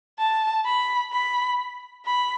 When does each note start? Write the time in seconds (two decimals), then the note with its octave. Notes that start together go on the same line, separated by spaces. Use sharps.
0.19 A5
0.66 B5
1.13 B5
2.06 B5